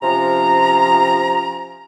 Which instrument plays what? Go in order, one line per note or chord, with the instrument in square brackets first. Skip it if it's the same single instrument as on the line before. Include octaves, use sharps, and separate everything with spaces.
[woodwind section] C3 F3 C#4 A#5